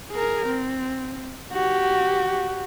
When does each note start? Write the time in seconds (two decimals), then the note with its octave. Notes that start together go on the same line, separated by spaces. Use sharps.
0.11 G#4 A#4
0.46 C4
1.52 F#4 G4